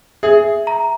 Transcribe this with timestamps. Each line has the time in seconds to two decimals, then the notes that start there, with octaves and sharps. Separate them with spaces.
0.23 G#4 E5
0.67 A#5